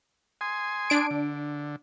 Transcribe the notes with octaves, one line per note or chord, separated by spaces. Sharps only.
G#5 C6 D#6
D4 D7
D3